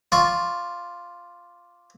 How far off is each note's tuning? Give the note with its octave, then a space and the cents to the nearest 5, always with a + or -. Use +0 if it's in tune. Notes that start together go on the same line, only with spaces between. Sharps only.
F4 +0 D5 +0 C#6 +0